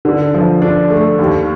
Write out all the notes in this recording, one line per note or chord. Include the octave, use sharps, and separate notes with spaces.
D3
F3
D4
A3
D#2